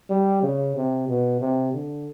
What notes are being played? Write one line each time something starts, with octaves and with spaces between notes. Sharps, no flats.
G3
C#3
C3
B2
C3
D3